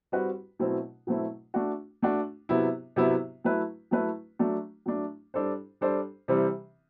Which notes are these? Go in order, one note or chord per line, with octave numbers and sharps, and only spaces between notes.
G3 C4 F#4 B4
B2 F#3 A3 C4 E4
B2 F#3 A3 C4 E4
A3 D4 F#4
A3 D4 F#4
C3 F#3 B3 E4
C3 F#3 B3 E4
F#3 A3 E4 B4
F#3 A3 E4 B4
F#3 A3 D4
F#3 A3 D4
G3 D4 A4 C5
G3 D4 A4 C5
C3 E3 G3 C4